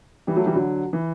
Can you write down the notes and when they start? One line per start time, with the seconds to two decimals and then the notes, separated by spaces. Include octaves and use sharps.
0.27 E3 G3
0.36 F#3 A3
0.46 E3 G3
0.55 D3 F#3
0.93 E3